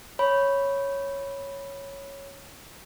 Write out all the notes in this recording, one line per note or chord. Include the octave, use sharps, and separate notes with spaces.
C#5 B5